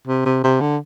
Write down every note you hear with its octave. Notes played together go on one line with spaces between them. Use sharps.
C3
C3
C3
D3